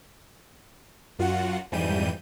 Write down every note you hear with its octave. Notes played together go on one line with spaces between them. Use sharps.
F#2 F4 F#4 F#5
F2 G#2 E3 G3 G6 D#7